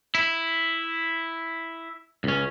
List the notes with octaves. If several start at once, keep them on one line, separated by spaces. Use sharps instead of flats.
E4
C#2 C#4